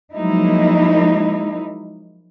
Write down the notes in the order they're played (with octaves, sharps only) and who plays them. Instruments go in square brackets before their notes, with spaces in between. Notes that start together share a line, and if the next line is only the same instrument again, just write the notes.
[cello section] F3 F#3 G#3 A#3 D#4 E4